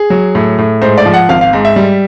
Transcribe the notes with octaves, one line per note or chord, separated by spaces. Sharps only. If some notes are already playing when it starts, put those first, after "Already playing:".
Already playing: G#4
F#3
A2
A2
G#2 C5
D5
F3
F#5
G#1 F5
F5
G#2
E5
G3